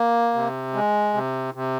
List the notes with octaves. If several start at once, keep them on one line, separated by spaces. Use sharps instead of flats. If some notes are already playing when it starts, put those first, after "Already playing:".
Already playing: A#3
C3
G#3
C3
C3